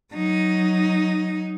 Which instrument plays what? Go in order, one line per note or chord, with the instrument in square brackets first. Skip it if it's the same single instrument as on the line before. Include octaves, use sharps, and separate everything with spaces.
[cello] F#3 D#4